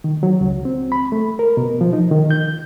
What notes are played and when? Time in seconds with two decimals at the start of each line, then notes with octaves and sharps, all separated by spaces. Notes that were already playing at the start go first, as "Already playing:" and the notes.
0.04 D#3
0.23 F#3
0.41 C#2
0.65 C4
0.92 B5
1.12 A3
1.39 A#4
1.57 B2
1.81 F3
1.93 D#4
2.11 D#3
2.31 G6